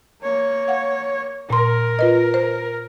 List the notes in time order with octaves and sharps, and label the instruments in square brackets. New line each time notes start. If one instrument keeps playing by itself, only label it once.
[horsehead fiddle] A#3 C#5
[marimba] F5 F#5
[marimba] A#2 C6 [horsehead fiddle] A#4
[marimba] F4 B4 D#5
C5